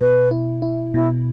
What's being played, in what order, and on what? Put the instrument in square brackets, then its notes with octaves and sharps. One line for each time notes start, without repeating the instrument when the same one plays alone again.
[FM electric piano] B2 [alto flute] B4
[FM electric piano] E4
E4
[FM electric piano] B2 [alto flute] E4